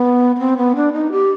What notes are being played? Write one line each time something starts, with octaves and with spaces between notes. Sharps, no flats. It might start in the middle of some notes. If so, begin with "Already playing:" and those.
Already playing: B3
B3
C4
B3
D4
D#4
G4